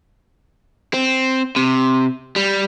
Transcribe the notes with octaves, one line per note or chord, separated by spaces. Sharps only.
C4
C3
G3